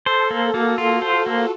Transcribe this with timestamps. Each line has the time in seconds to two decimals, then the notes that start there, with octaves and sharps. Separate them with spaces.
0.06 A4 C5
0.31 A#3
0.54 A#3 F#4
0.78 F4 A4
1.02 C5
1.26 A#3
1.38 F4